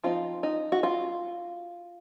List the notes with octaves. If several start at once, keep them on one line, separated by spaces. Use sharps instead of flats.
F3 C4 D#4 F4
D#4
F#4
F4